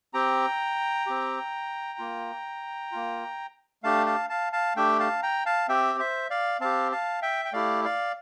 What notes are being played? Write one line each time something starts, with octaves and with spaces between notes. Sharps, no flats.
C4 G4 G5 A#5
C4 G4
A#3 F4
A#3 F4
A3 D4 G4 F5 A5
F5 A5
F5 A5
F5 A5
A3 D4 G4 E5 G5
F5 A5
G5 A#5
F5 A5
C4 G4 E5 G5
C5 E5
D5 F5
C4 G4 F5 A5
F5 A5
E5 G5
G5
A3 E4 G4 D5 F5
D5 F5